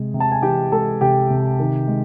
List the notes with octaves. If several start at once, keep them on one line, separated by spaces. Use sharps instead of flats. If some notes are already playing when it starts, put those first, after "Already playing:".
Already playing: C3 G#3 G#4
C3
A5
G#5
E3 G4 G5
G#3 A4 A5
C3 G4 G5
C3
D#3
G#3